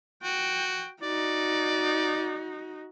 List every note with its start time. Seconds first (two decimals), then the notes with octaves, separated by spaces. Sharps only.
0.23 F#4 G5
1.03 D#4 F#4 D5